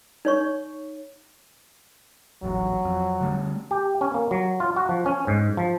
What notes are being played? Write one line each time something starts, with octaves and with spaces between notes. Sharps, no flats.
D#4 C#5 C#6
D#1 A1 F#3
F2
D3 G3 A3
G4
C#4
A#3
F#3
F4
F#4
F3
C#4
G#2
F3